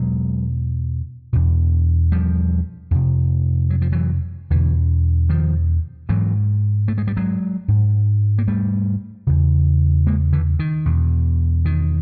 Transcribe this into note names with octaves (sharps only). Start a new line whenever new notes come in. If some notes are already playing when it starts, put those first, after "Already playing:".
Already playing: E2 B2 F#3 G#3
E2 B2
F3 G3
F2 C3
F#3
F3
E3 F#3
E2 B2 D3 E3
D#3 F3
G#2 E3 F#3
A3
G#3
G3
F#3 G#3
G#2
A#3
G3 A3
E2 C#3
G#3 A#3
D3 E3
D#3
E2 B2
D#3